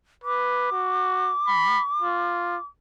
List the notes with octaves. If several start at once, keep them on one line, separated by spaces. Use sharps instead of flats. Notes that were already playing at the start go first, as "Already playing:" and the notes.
B4 D6
F#4
B5
F4